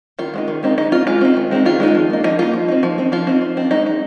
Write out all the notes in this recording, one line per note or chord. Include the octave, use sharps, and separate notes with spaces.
D#3 F4
G#3 C4 D#4
D#3
G#3 C4 D#4
G#3 D#4
C4 D#4 F4
G#3 F4
C4 D#4
D#3
G#3 C4 D#4
D#3 F4
G#3 C4 D#4
F3
A#3 D#4
F3 D#4
A#3 D#4 F4
F3
C4 D#4
F3
C4 D#4
F3 F4
C4 D#4
F3
C4 D#4
G#3 D#4
D#4